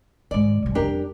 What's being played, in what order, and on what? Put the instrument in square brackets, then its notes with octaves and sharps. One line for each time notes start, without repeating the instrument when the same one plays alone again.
[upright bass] G#2 D#3 [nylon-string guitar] D5
[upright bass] C3 G3
[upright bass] F2 G3 [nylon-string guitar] D4 G4 A#4